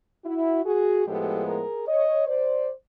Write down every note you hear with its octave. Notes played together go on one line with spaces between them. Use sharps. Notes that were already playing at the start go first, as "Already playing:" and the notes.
E4 F#4
F#4 G#4
A2 F3 G#3 B3 G4 A4
G#4 A#4
C#5 D#5
C5 D5